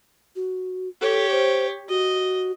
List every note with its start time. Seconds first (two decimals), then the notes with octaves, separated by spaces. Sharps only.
0.36 F#4
1.02 G4 A4 C#5
1.31 C5
1.89 F#4 D#5